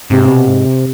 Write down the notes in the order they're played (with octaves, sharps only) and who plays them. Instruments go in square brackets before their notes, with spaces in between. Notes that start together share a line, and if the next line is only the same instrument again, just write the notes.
[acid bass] G#2 [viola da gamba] C3
[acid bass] B2
G#2
C3